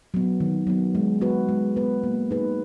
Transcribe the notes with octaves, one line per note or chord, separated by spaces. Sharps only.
F#3 B3
D#3
F#3 B3
G#3
B3 F#4 B4
G#3
B3 F#4 B4
A#3
D#4 G#4 B4